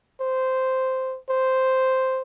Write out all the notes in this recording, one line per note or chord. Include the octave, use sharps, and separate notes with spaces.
C5
C5